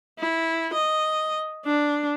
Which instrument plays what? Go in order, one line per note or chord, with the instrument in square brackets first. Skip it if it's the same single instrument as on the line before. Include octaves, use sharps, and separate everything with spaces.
[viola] E4
D#5
D4